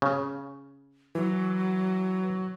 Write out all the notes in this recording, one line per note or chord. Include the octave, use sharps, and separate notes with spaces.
C#3
E3 F#3